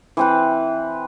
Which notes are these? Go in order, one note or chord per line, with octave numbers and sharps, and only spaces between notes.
E3 C4 B4